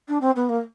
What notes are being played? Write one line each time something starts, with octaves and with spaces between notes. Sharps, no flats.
D4
C4
B3
A#3